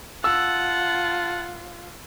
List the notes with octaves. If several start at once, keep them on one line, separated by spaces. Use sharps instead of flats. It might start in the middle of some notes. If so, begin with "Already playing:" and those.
F4 F#5 A5 E6